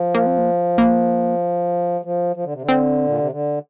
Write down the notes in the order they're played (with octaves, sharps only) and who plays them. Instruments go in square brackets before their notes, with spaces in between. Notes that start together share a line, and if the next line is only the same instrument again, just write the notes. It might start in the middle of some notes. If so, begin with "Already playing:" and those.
Already playing: [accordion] F3
[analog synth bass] A#3
C4
A#3
A#3
[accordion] F3
F3
D3
C3
D3
[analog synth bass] C4
[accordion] A#2
C3
D3